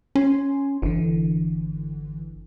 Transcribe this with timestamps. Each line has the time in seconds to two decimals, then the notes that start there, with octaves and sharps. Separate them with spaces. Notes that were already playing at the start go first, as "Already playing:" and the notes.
0.15 C#4 G#5 C6
0.82 G1 D3 E3